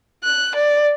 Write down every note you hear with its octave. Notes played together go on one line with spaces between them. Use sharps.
F#6
D5